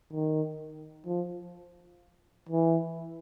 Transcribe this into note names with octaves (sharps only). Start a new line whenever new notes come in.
D#3
F3
E3